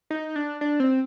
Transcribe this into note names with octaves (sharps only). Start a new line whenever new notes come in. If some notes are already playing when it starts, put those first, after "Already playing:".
D#4
D4
D4
C4